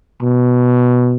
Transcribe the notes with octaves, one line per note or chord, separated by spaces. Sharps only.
B2